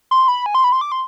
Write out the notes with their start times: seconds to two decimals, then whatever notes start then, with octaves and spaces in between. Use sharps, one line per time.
0.11 C6
0.28 B5
0.46 G#5
0.55 C6
0.64 B5
0.72 C6
0.81 D6
0.92 C6